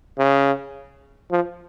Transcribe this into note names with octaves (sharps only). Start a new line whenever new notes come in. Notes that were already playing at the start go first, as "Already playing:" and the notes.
C#3
F3